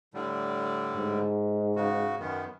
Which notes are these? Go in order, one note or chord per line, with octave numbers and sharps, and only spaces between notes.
A2 D3 G3
G#2
C#3 F#4
F#2 D#3 B3